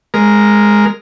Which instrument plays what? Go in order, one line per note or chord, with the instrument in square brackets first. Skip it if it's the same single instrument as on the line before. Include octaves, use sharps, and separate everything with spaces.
[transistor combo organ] G#3 A#4